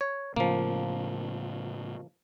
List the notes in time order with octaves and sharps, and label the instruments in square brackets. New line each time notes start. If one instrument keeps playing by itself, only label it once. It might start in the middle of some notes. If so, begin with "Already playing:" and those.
[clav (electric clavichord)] C#5
[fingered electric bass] A2 C#3 [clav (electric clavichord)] F3 A#3